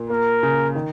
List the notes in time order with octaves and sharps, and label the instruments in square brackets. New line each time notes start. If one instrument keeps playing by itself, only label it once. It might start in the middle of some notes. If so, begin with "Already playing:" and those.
Already playing: [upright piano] A#2
[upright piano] A#3 [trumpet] A#4
[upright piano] C#3
D#3